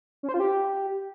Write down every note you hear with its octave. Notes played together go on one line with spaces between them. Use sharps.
C#4
C5
F4
G4